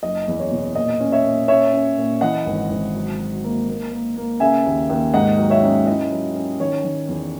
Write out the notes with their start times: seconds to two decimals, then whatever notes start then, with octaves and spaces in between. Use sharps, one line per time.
0.03 F#1 D#5
0.28 E2
0.40 C#5
0.52 B2
0.75 A#2 D#5
1.00 C#4
1.12 C#5 E5
1.24 A#2
1.48 C#4 C#5 E5
1.73 C#4
1.98 A#2
2.21 E3 D#5 F#5
2.46 G#1
2.70 G#1
2.95 F#3
3.18 F#3
3.44 A#3
3.68 A#3
3.92 A#3
4.17 A#3
4.40 C#3 E5 G#5
4.66 D#2
4.89 D#2
5.14 G#2 D#5 F#5
5.39 F#3
5.50 C#5 E5
5.63 C#4
5.87 E4 D#5
6.11 F#3
6.35 C#4
6.60 D#3 C#5
6.84 D#3
7.08 E2